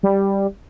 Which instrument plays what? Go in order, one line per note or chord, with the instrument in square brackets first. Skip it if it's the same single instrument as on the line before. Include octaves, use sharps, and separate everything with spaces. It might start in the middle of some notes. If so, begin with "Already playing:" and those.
[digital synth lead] G3